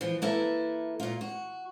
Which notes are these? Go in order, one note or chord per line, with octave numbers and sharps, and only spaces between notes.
E3 F3
A#3 E4 A4 B4
A#2 F4
F#4